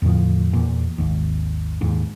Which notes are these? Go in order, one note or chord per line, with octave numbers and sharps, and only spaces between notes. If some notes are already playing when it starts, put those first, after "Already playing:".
E2 A2 D3 F3
E2 A#2
G#1 D#2
D#2 G#2